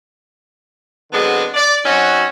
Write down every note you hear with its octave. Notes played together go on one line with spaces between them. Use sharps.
D3 F#3 G#3 B3 C4 D4
D5
F#3 C4 C#4 D#4 F#4